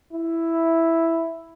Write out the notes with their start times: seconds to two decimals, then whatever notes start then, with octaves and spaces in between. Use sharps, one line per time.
0.13 E4